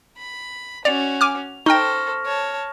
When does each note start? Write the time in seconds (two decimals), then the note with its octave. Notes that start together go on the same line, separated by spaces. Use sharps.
0.17 B5
0.85 C#4 F#4 D5 F7
1.21 G#5 D6 F6
1.66 D#4 A4 C5 G5 C#6 F6 A#6
2.26 C#5 A5